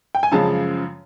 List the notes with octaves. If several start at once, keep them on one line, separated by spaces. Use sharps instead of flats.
G5
G#5
F#2 C#3 F3 G#3 A5